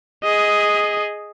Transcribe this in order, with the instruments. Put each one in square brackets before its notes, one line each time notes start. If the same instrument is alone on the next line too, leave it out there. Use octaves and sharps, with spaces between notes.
[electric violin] G#4 D#5